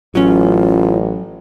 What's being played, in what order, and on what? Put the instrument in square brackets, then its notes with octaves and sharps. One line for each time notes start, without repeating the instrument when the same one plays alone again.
[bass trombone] A1 [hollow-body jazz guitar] F#3 C#4 [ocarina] F4